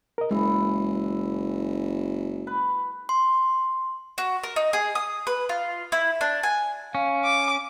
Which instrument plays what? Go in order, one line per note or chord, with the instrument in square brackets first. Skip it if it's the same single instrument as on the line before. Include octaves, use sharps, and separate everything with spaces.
[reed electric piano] A#4 D#5
[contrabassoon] F#1 [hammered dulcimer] E3 [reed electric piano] G#3
[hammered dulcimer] B4
[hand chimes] C6
[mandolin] F#4
A#4
D#4
G#4
D#6
B4
F4
E4
D4
G#5
[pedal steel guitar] C#4 [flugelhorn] F5
[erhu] D6